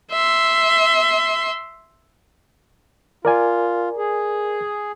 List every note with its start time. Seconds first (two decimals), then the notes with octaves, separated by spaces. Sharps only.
0.11 E5 C6
3.25 F4 A#4 D5 G#5
3.97 G#4